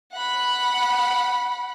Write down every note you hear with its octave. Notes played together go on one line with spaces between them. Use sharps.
F#5 B5